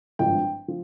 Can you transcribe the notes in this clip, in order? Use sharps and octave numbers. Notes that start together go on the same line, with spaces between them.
G#1 G2 F3 G5
F3